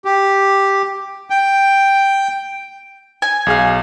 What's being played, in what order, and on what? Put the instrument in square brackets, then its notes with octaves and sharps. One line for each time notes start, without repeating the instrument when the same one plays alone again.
[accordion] G4
G5
[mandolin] G#5
[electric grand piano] B1 G#4 F5